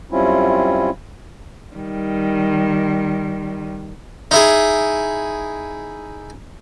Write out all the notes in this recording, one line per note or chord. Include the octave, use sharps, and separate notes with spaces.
F#2 G3 C4 C#4 E4 F4
D#3 G3
D#4 E4 G#4